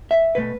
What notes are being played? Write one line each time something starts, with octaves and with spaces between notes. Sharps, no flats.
E5
B2 A3 B4